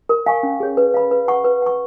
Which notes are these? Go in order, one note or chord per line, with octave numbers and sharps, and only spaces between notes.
A#4
F5 G#5 C#6
C#4
G#4 C#5
B4
F5 B5
B4
F#5 C#6
B4
F#5 C#6